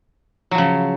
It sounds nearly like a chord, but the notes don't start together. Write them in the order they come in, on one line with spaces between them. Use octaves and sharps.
F#3 F3 C#3